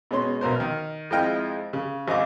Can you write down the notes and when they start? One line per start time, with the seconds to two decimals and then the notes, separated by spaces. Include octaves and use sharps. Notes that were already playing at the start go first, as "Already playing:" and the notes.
0.11 B2 G#3 C#4 C6
0.41 B1 B2 A#4 C5
0.56 D#3 F6
1.10 F2 G#3 E4 D#5 G5 F6
1.73 C#3
2.08 G#1 D#5 F5 D6